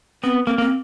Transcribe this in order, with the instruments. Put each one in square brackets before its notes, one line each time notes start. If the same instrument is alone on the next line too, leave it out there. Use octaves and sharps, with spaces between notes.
[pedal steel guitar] B3 [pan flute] C4
[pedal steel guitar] A#3 [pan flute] C4
[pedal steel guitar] A#3 [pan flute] C4